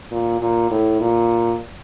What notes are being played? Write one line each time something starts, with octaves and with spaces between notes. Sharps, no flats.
A#2
A#2
A2
A#2